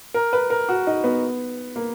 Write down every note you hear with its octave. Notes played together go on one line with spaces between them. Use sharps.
A#4
B4
A#4
F#4
D#4
B3
A#3